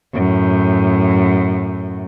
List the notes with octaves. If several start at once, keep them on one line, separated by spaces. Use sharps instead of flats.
F#2 A2